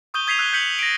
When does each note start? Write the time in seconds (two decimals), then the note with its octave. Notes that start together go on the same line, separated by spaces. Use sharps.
0.14 C#6 D#6 G6 D#7 G7
0.27 D#6 G#6 B6 C7 D#7 F7
0.38 E6 F#6 G#6 C7 D#7 G7
0.52 F#6 G6 B6 C#7 F#7
0.79 A#6 D7